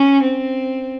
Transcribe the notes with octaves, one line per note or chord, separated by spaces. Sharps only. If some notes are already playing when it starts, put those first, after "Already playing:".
Already playing: C#4
C4